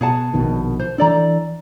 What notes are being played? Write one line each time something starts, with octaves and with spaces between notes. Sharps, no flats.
B2 G#4 F#5 A5
A#1 B2 D#3
C5
E3 D4 A4 D5 A#5